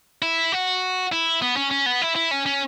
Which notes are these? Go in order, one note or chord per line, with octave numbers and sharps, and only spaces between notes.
E4
F#4
E4
B3
C#4
C#4
B3
E4
E4
C#4
C#4